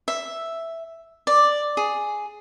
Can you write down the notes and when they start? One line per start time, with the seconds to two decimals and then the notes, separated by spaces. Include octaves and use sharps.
0.08 E5
1.27 D5
1.77 G#4